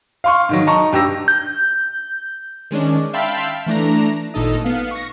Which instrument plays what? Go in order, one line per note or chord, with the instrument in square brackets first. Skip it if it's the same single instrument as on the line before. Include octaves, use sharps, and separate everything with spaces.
[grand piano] F5 C6 C#6
G#2 D#3 F#3
D#4 A5 A#5 C#6
G2 G4 E6 A#6
[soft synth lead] G6
[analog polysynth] D#3 G#3 C#4 D4
E5 F5 G5 A5 B5 C6
E3 A3 D4 A#5
G#1 A#2 D#4 A4 D#5
B3 F5
C#6 A#6